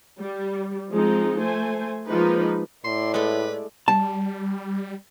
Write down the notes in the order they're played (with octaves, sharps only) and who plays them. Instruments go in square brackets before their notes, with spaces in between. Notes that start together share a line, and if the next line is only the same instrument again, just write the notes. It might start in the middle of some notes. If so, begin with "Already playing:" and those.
[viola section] G3
F3 G#3 C4 D#4
A3 C5 G#5
F3 G#3 A#3 D#4 B4
[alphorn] A2 [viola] E4 D5 [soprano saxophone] C6
[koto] G#3 A3 [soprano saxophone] B4
[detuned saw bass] G3 [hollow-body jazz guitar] A5